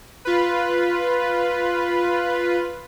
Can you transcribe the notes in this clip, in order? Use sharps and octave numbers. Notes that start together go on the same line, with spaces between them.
F4 B4